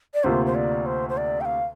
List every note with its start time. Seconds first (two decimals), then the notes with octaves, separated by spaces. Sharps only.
0.14 D5
0.24 D2 C3 A#3 F4 C5
0.46 C5
0.55 D5
0.86 C5
1.09 C5
1.17 D5
1.41 G5
1.45 F5